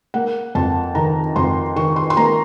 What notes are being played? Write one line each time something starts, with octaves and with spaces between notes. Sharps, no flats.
A#3 F#5
F2 A5
D#3 A#5
F2 C6
D#3 C#6
C6
C6
A#3 A#5